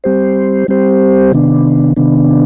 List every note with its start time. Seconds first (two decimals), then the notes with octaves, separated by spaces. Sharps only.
0.04 G3 C4 G4 C5
0.68 G3 C4 G4 C5
1.32 C3 D#3 B3 D4
1.96 C3 D#3 B3 D4